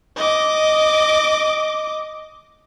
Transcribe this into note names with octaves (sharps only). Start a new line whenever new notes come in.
D#5 D6